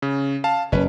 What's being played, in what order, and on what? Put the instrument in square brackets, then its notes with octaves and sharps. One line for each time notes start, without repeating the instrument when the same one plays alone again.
[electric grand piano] C#3
F5 A5
[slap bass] F#1 [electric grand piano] C#4 B4